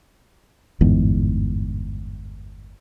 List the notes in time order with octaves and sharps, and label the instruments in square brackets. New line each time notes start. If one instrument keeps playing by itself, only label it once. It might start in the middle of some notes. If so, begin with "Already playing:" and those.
[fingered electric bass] G1 E2 G#2